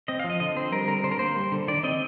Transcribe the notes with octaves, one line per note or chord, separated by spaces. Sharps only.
C4 D#5
F5
F3
D#5
D3 D#5
C4 C5
G3 A#4
D3 A#4
D3 C5
A#4
A#3 C5
G3
D3
D#3 D5
C4 D#5